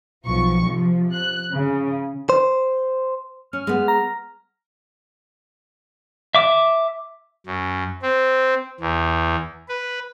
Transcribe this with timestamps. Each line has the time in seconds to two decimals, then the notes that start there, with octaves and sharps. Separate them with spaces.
0.25 B1 F3 C#6
0.64 C3 F3
1.13 F#6
1.51 C#3
2.30 C5
3.53 C#4 F6
3.67 G#3 B3
3.88 A#5
6.35 E5 D6
7.46 F#2
8.02 C4
8.80 E2
9.69 B4